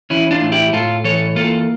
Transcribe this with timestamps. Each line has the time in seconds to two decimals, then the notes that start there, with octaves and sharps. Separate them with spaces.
0.10 E3 C#4 E4
0.31 D4 F4
0.41 A2
0.52 E4 G4
0.73 A2 F4 A4
1.04 E3 A4 C#5
1.36 A#3 F4 A4